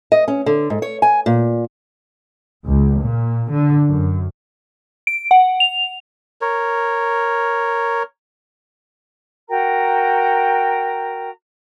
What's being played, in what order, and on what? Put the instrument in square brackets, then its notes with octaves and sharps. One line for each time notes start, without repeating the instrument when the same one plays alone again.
[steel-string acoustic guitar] D#5
C#4
D3
G#2
C#5
G#5
A#2
[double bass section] C#2
A#2
D3
F#2
[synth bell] D7
F#5
F7
[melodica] A#4 C#5
[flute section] F#4 A#4 G5 A#5